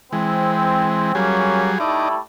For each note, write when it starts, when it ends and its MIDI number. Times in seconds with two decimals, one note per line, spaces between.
0.13 1.12 52
0.13 1.12 56
0.13 1.11 60
1.15 1.79 54
1.15 1.79 55
1.15 1.71 58
1.15 1.71 61
1.15 1.79 68
1.80 2.18 55
1.80 2.18 57
1.80 2.09 63
1.80 2.18 64
1.80 2.09 74